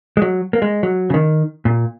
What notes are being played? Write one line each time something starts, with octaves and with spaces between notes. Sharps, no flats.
G#3
F#3
A#3
G#3
F#3
C#3
D#3
A#2